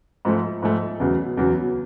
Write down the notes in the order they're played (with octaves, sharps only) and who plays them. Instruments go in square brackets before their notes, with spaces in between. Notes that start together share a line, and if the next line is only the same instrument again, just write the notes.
[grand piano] G#2 F3 A3
G#2 F3 A3
E2 C#3 F#3
E2 C#3 F#3